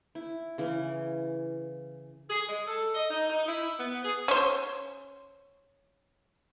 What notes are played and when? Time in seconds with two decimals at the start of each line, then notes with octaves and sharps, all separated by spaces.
0.15 E4
0.58 C#3 E3
2.29 G#4
2.48 G#3
2.67 A4
2.95 D#5
3.10 D#4
3.29 D#4
3.48 E4
3.79 B3
4.04 G#4
4.28 C#4 C5